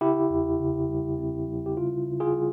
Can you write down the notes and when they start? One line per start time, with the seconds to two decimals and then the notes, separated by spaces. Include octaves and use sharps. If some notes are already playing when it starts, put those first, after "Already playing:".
0.01 C#3 E4 G4
0.30 E2
0.60 C#3
0.89 G3
1.18 C4
1.48 G3
1.66 G4
1.77 C#3 F4
2.06 C#3
2.20 F4 G#4
2.36 G3